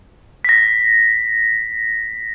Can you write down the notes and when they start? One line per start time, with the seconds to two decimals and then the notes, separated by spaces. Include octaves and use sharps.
0.45 A#6 B6